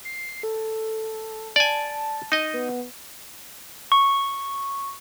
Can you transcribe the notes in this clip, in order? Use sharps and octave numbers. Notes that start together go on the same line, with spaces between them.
C7
A4
D5 G#5 A5
D#4 D#5
B3
C#6